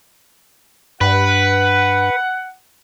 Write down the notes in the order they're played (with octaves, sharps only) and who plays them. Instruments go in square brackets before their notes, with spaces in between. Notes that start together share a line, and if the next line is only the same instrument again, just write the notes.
[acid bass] G2 [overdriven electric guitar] B4 [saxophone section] F#5